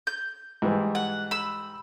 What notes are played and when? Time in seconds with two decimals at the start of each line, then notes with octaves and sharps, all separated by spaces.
0.07 G6
0.62 G#2 E3 G3
0.95 F#5
1.31 B5 E6